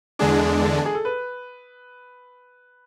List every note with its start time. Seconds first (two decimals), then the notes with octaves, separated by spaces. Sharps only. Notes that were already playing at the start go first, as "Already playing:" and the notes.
0.19 E2 D3 G#3 D4 G#4
0.62 A4
0.85 G#4
0.95 A4
1.05 B4